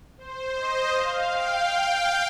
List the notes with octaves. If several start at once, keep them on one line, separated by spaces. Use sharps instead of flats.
C5
D#5
F5
G5